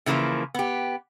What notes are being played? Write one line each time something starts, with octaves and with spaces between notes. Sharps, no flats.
C#3 E3 F3 A3 A#3
B3 G4